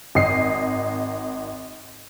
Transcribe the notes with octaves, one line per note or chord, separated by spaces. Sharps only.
G#1 D#5 C7